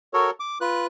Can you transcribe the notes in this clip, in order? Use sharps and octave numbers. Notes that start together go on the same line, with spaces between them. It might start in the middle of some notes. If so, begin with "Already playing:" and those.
F#4 A4 A#4 C#5
D6
F4 B4 F#6